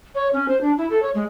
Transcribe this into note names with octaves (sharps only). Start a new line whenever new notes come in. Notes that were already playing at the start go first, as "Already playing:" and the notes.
C#5
C#4
C5
D4
E4
A4
C#5
G#3